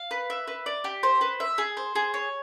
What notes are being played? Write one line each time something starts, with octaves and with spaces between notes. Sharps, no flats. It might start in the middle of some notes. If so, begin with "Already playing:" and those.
Already playing: F5
B4
E5
B4
D5
G4
C5
B4
E5
G#4
C5
G#4
C#5